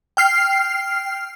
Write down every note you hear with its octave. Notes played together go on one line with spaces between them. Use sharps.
G5 F6 C7